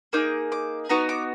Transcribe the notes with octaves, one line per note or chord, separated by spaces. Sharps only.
A#3 D#4 G#4 D6
D6
B3 D#4 F#4 A#5
D6